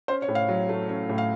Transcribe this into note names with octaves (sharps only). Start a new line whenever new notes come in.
C#4 C5
C#5
A2
F5
F#3
A3
C#4
A2
F5